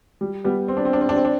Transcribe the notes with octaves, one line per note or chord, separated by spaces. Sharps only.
G3
G3 B3
C4
D4
C4
D4
C4
D4
C4
D4